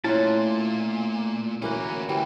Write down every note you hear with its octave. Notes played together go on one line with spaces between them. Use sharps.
A#2 A3 C#4 E4 F4 F#5 A5
D2 E3 A#3 C#4 F#4
D2 E3 G3